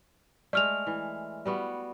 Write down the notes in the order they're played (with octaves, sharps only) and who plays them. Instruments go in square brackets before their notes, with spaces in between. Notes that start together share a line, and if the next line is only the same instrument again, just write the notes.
[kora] G#3 A3 [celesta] D5 F6 F7
[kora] E3
G3 B3 F#4